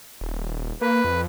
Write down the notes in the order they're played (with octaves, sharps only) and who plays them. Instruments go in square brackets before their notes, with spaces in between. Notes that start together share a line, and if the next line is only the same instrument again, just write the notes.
[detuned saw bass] D#1
[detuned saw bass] A#3 [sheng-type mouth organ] B4
[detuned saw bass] F2